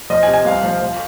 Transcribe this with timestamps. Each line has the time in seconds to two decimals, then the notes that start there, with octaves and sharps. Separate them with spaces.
0.10 F3 D#5
0.23 G#5
0.28 C3
0.34 G#5
0.45 C2 F5
0.63 F3
0.82 F3